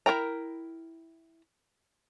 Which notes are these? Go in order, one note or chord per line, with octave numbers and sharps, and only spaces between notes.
E4 F4 A#4 G5 A#5